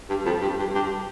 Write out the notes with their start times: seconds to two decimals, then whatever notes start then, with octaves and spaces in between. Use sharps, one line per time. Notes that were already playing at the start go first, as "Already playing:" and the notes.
0.09 G2
0.26 F2
0.42 G2
0.59 G2
0.75 G2